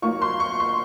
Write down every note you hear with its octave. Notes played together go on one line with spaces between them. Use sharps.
F#3 A#3 F4 C#6
C6
C#6
C6